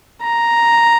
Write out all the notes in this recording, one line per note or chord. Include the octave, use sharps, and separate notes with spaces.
A#5